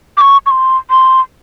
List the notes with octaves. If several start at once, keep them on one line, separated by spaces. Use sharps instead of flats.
D6
C#6
C#6
C6
C6